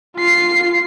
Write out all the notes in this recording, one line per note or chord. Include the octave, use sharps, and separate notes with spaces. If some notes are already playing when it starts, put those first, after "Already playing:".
F4 C7